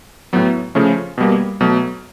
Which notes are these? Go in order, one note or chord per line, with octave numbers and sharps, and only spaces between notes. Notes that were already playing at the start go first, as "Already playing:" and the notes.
A2 F#3 B3
C#3 F3 A3 C#4
B2 G3 A#3
B2 F#3 A3